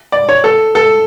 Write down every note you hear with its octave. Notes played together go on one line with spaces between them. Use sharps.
D5
C#5
A4
A4